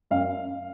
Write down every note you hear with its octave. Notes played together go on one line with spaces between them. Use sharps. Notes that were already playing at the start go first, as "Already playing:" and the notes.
F#2 F5